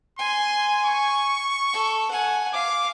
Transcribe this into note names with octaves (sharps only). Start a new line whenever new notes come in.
G#5 C6
C#6
A4
F#5 G#5
F5 D6